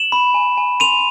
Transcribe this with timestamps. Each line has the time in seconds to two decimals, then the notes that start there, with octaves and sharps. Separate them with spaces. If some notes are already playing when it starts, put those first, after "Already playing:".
Already playing: E7 F#7
0.12 B5
0.34 G#5
0.57 G#5
0.80 C6 D#7 F7